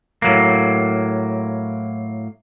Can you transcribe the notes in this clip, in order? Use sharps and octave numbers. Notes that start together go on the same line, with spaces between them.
A2 F#3 A#3